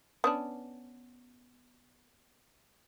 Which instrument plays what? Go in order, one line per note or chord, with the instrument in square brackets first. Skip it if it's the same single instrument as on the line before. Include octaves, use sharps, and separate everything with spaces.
[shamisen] B3 C#4 D4